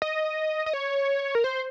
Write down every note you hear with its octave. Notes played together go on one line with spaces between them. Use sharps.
D#5
D#5
C#5
A#4
C5